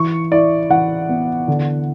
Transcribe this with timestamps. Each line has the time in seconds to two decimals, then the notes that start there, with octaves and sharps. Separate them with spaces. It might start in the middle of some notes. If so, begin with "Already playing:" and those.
Already playing: E3 C#6
0.31 E4 D5
0.70 E3 F#5
1.09 B3
1.48 D3